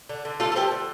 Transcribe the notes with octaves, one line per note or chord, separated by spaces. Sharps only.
D3
D3
A3 F4 A4
A4
F3 G4 C5
D3